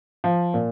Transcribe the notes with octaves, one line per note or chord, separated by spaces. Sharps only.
F3
A#2